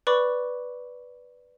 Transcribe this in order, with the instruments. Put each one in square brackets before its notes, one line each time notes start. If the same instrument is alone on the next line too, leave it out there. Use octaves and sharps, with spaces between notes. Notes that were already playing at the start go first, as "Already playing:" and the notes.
[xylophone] B4 D5 B5 C#6 D6